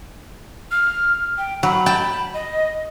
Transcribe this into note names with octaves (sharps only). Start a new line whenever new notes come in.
F6
G5
F#3 B5
G5 A5
D#5